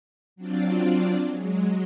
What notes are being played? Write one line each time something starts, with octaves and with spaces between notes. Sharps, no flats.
F#3 C4 D4 F4 D5
F#3 G#3